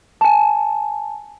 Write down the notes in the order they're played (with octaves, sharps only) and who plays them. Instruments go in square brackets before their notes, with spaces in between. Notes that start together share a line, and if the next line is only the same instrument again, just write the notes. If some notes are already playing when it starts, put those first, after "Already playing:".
[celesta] G#5 A5